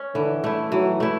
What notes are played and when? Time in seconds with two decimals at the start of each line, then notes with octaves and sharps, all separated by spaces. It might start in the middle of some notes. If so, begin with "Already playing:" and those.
Already playing: C#4
0.15 D3 E3
0.44 A3 E4
0.71 E3 F#3
1.00 A3 E4